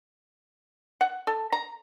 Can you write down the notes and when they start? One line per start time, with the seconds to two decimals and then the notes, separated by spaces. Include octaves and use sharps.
1.01 F#5
1.27 A4
1.52 A#5